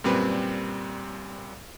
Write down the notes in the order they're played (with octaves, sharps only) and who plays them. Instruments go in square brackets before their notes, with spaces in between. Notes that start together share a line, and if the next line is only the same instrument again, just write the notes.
[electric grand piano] F#2 A#2 G3 C4 B4